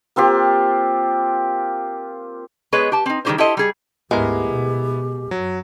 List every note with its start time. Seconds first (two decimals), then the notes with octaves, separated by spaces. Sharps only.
0.16 A#3 C4 F4 G4
2.72 G#3 B3 G#4 B4 C#5 D#5
2.92 G4 A5
3.06 C4 D#4
3.25 D#3 G3 D#4 G4 G#4 C5
3.38 E4 G4 A4 C5 D#5
3.57 G3 G#4
4.11 D2 G#2 G#3 B3 E4 G4 A#4
4.48 B2
5.31 F#2 F#3